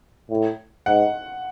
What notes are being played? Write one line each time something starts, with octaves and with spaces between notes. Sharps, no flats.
A2
G#2 F#5